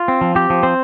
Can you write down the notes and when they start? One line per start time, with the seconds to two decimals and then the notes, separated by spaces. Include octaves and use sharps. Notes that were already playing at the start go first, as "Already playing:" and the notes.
Already playing: F4
0.08 C4
0.21 F3
0.35 C4 G4
0.50 F3
0.63 C4 C5